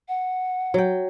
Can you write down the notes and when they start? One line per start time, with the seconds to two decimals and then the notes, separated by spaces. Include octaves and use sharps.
0.08 F#5
0.74 F#3 G5